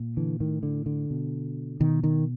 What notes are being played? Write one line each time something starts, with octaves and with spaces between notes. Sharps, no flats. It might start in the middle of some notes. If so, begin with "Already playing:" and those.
Already playing: A#2
D3 E3
A2 D#3
D3
D3
B2
B2 D#3
D#3